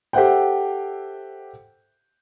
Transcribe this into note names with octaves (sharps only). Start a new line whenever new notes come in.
G4 A4 C5 E5 F#5 G5